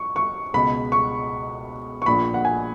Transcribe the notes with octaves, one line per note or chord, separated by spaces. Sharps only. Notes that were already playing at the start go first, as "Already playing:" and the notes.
Already playing: C#6
C#6
C#2 B2 B5
C#6
C#6
A#1 A#2 B5
F#5
G#5